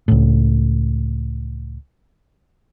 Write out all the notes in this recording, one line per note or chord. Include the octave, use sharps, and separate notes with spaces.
C#2 A2